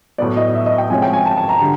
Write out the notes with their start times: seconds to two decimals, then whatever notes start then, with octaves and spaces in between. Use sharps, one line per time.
0.18 A2 F#3 B3 D5
0.37 D#5
0.55 E5
0.66 D#5
0.78 G5
0.90 C3 F3 G#3 C#4 G#5
1.02 G5
1.13 G#5
1.26 A5
1.37 A5
1.49 A#5
1.60 D3 G3